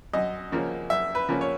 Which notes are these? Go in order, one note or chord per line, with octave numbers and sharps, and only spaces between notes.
F#2 D#5
C#3 F3 A#3 C#4
F#2 E5
B4
C#3 F3 A#3 C#4
C#5